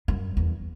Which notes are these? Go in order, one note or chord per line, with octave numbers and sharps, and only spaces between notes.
F#2
E2